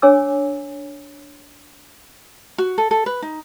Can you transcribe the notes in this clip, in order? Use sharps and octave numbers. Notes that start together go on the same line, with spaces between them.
D4 C#5 G#5 D6 E6
F#4
A4
A4
B4
D#4